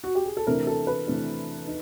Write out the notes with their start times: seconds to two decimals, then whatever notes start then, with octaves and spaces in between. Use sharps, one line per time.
0.04 F#4
0.15 G4
0.26 G#4
0.37 A4
0.47 C3 E3 A3 D4 A#4
0.67 A4
0.87 B4
1.07 C3 E3 A3 D4
1.67 D#4